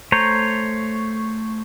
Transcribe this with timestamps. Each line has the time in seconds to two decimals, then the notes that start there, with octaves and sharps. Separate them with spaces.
0.12 A3 C5 C#5 A#5